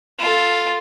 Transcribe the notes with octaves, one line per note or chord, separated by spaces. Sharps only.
F4 A4